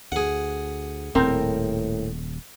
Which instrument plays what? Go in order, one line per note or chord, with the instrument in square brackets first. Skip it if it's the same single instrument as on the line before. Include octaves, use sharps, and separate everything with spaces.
[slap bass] D2 [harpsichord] G#4 F#5
[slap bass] D#1 [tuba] A2 [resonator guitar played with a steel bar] C4 A#4 G5